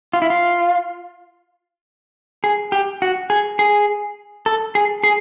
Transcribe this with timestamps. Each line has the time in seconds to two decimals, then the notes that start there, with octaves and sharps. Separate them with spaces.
0.13 F4
0.22 E4
0.30 F4
2.44 G#4
2.72 G4
3.02 F#4
3.30 G#4
3.59 G#4
4.46 A4
4.75 G#4
5.03 G#4